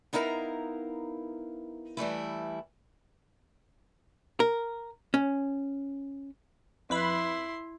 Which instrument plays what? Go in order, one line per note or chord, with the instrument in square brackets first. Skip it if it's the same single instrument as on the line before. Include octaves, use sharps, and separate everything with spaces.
[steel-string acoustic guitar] B3 D#4 E4 A#4 F5 A#5
E3 G3 A3 E4
[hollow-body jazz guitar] A#4
C#4
[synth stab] F2 B4 B5 [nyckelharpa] E4 C6